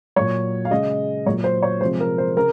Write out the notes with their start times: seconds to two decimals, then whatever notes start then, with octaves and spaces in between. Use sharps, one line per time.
0.16 A#2 F#3 C#5
0.65 F5
0.71 C#3 G#3 D#5
1.26 A#2 F#3 C#5
1.44 C5
1.63 C#5
1.81 C3 F3 G#3 C5
2.00 A#4
2.18 C5
2.37 C#3 A#4